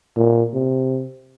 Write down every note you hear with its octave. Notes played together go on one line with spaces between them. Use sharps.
A#2
C3